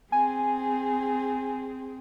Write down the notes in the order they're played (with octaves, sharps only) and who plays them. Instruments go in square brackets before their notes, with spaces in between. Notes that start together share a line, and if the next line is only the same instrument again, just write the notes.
[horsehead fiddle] C4 G#4 [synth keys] G#5